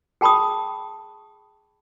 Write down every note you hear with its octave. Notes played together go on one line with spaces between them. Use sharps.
G#4 G5 A5 B5 C#6 D#6